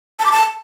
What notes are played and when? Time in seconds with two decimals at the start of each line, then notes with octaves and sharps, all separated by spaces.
0.19 A5
0.26 D6
0.32 A5